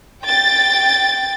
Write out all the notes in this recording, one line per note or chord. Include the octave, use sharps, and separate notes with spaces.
G5 A6